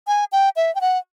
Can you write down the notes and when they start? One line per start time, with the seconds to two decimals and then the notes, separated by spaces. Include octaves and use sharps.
0.07 G#5
0.32 G5
0.56 E5
0.75 G5
0.81 F#5